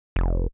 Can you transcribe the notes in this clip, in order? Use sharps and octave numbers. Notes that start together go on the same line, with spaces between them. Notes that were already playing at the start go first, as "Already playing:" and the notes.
F1